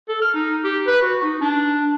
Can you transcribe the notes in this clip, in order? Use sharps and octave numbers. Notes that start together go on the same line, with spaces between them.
A4
F6
D#4
G4
B4
F#4
D#4
D4